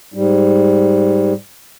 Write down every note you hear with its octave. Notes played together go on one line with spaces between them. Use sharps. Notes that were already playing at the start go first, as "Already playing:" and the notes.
G#2 G3